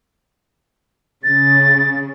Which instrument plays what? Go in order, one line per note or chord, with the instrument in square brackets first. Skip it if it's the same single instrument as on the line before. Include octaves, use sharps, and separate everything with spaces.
[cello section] C#3 [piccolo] A6